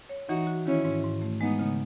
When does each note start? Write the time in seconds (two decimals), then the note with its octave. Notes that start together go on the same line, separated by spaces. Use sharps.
0.09 C#5
0.29 E3 D#4 F#4
0.47 F#4
0.66 D#3 C#4 E4
0.85 G#2
1.04 G#2
1.22 A3
1.40 G#3 B3 D#4
1.59 C#3